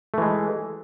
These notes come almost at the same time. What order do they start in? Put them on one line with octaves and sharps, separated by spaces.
A3 E3 G#3